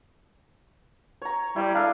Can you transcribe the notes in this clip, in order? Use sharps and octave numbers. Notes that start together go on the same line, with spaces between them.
C#5 A#5
G3 E4 D5
D4 A4 F5 D#6